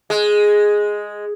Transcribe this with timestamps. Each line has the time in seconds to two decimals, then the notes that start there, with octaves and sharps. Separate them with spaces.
0.10 G#3